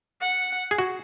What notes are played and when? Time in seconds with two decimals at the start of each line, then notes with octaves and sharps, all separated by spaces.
0.21 F#5
0.71 G#4
0.78 F#4